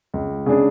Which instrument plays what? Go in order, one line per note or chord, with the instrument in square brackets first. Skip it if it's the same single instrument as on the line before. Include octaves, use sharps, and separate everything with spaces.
[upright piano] C#2
C#3 G#3 D4 G#4